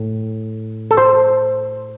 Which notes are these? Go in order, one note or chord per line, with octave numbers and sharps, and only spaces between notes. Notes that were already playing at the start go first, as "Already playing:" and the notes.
Already playing: A2
A4
C5